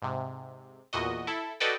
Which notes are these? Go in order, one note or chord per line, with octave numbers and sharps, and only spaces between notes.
G#2 C3
E2 A#2 F#4 D#5
E4 A4
F#4 A4 B4 D5 D#5 G5